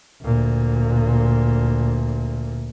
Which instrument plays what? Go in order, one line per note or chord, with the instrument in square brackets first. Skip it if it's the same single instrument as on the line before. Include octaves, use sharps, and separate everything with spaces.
[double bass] D2 A#2